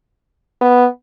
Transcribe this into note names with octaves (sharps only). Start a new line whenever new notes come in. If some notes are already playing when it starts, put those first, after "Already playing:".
B3